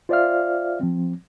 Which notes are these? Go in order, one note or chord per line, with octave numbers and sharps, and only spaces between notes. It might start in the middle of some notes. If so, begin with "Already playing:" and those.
F4 C5 D5 E5 F5 F6
F3 C4